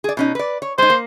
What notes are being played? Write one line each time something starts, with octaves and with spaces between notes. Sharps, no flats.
G#4 D5
B2 C#4 D#4
B4 D5
C#5
G#3 D#4 C5
A#3